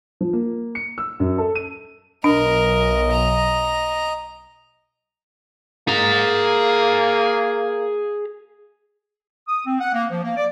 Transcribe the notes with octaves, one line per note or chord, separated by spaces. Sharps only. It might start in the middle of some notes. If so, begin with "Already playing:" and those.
F3
A#3
C#7
E6
F#2
A4
D#7
B1 D4 A#4 D#5
A#5
A#3 G#4 A#5
D#6
C4
F#5
A#3
F3
A#3
D5